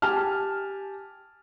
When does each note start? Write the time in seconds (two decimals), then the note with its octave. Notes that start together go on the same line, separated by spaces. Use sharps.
0.02 G4 G#5 A5 F6